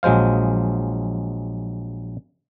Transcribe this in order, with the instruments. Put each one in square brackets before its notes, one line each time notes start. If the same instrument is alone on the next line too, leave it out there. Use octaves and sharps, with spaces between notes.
[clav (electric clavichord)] A#1 F#3 G#3 C5 F5